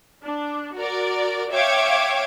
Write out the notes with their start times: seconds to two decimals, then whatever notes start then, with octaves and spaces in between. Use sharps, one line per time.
0.24 D4
0.76 F#4 A#4 D5
1.51 C#5 E5 F5 G5 D6 G#6